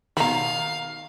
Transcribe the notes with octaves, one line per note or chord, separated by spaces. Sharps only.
B2 D#3 F5 A#5 B5